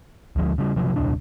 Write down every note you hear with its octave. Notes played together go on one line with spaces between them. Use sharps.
D2 F3 G#3
C#3 G3
C3 F3 F#3
D#1 C2 D4